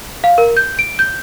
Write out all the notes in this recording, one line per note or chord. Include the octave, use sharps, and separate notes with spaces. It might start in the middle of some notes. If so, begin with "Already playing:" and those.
F5
A#4
G6
D7
G6